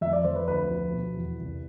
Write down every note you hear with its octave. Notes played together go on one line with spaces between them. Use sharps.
F2 E5
D5
F2 C5
B4
D2 B4
F3
B2
E2
C2